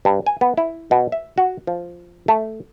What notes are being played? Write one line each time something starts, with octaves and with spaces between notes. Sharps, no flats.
G2
G#5
B3
E4
B2
E5
F#4
F3
A3